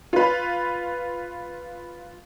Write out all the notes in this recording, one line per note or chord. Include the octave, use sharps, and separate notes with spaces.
F4 B4